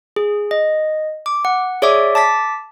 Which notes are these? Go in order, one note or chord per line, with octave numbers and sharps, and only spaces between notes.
G#4
D#5
D6
F#5
G#4 C#5 D5 E5 D6
A5 D6 A6 B6